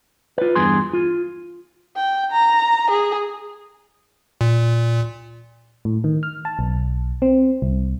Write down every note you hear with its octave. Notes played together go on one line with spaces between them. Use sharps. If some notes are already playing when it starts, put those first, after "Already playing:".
F4 B4
E2 G2 G#4 C6
F4
G5
A#5
G#4
A#2
A2
D#3
F6
A5
B1
C4
C2